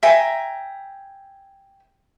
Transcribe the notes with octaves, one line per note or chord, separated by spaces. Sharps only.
E5 G5 G#5 A#5